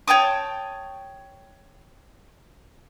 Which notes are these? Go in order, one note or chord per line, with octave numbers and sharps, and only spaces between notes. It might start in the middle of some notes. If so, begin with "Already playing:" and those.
C#5 G5 A5 D#6